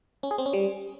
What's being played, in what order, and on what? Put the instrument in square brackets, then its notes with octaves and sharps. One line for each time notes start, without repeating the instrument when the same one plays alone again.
[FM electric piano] C#4
G#4
C4
C#4
G3